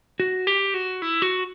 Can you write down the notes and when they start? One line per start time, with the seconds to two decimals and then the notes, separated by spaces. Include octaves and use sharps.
0.20 F#4
0.47 G4
0.74 F#4
1.02 E4
1.22 F#4